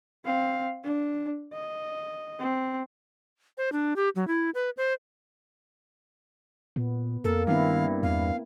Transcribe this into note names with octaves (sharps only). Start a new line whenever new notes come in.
C4 F5
D4
D#5
C4
C5
D4
G4
F#3
E4
B4
C5
A#2 B3
F2 A#3 A4 A#4
G2 D#3 B3 C4 E4 F5
E2 F5